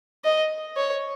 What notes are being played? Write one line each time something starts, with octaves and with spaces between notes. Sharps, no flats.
D#5
C#5